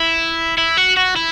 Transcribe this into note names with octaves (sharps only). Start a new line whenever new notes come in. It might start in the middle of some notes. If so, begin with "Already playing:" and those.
Already playing: E4
E4
F#4
F#4
E4